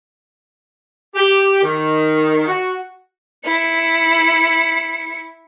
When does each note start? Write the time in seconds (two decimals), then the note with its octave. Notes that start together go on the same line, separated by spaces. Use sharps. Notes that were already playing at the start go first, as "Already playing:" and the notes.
1.15 G4
1.63 D#3
2.47 F#4
3.45 E4 C#7